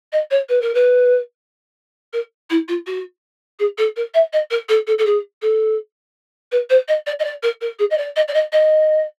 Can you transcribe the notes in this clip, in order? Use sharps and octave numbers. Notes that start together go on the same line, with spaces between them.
D#5
C#5
B4
A#4
B4
A#4
E4
F4
F#4
G#4
A4
A#4
E5
D#5
A#4
A4
A4
A4
G#4
A4
B4
C5
D#5
D5
D#5
D5
A#4
A#4
G#4
D#5
D5
D#5
D5
D#5
D#5